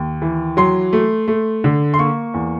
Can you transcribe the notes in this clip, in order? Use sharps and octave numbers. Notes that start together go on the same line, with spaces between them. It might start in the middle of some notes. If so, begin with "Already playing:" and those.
Already playing: D#2
E3
F#3 C6
A3
A3
D3
C6
A#3 C#6
E2